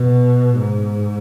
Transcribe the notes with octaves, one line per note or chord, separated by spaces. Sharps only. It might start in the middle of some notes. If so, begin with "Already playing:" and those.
Already playing: B2
G#2